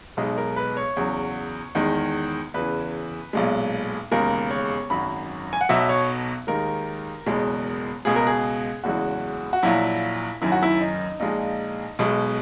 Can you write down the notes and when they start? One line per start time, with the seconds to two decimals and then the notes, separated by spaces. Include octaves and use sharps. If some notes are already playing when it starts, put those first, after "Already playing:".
0.17 B1 B2 G#3 D#4
0.38 A#4
0.56 B4
0.77 C#5
0.97 E2 C#3 F#3
1.75 E2 D#3 G#3
2.54 E2 C#3 E3 B4
3.33 B1 A#2 G#3
4.12 E1 D#2 C#3 G#3 A#4
4.50 C#5
4.90 G#1 F#2 D#3 F#3 B5
5.53 G#5
5.61 F#5
5.69 B1 B2 F#3 E5
5.89 C#5
6.47 D#2 D#3 G#3 A#4
7.26 F#1 E2 B2 G#3
8.05 C#2 B2 G#3 G#4
8.16 A#4
8.27 G#4
8.84 F#1 E2 C#3 E3 G#3 F#4
9.53 F#4
9.63 A#1 A#2 F#3 E4
10.41 F#1 F#2 D#3 E4
10.52 F#4
10.63 E4
10.81 D#4
11.20 A#1 A#2 G#3 D#4
11.99 B1 B2 G#3